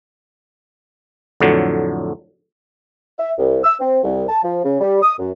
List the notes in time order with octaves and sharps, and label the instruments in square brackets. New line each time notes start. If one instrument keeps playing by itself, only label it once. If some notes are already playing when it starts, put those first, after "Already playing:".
[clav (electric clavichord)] F2 A2 D3 F#3
[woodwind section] E5
C2
E6
C4
C2
A5
F3
C#3
G3
D#6
F#2